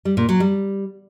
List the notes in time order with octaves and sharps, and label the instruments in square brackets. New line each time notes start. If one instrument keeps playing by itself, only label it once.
[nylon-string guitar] G3
A#2
F#3
G3